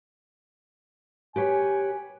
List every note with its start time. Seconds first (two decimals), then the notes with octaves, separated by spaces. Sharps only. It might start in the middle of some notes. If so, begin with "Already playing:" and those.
1.36 G4 B4 C#5 G#5